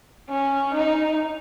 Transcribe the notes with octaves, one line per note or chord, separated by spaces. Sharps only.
C#4
D#4